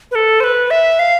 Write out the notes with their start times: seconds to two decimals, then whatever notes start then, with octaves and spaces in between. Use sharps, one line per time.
0.11 B4
0.15 A4
0.40 C5
0.44 B4
0.70 E5
0.99 F5